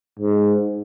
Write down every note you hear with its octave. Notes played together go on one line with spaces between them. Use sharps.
G#2